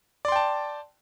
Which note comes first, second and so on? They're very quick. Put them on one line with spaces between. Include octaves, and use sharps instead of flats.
D5 C6 G5 A5